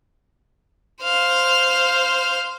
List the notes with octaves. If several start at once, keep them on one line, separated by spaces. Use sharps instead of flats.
C5 F5